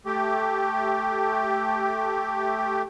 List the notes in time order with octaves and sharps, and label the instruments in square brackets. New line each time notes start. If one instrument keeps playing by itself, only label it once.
[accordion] A3 G4